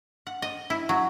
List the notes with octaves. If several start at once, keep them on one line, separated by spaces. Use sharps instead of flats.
F#5
D#5
E4
F#3